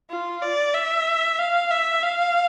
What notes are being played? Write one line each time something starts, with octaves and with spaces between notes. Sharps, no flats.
F4
D5
E5
F5
E5
F5